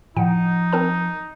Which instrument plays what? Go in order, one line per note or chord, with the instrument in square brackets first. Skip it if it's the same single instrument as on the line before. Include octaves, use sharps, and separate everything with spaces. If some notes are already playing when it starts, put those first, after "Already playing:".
[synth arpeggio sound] A2 G5 [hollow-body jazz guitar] F3 F#5 [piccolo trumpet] D#4
[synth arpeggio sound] C4 A#4 A5